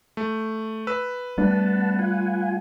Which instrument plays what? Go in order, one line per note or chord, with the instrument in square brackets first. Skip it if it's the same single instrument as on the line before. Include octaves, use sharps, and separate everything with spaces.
[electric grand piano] A3
B4 E6
[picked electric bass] G3 A3 D4 [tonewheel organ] B3 F#5 A5
[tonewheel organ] F4 F#5 G#5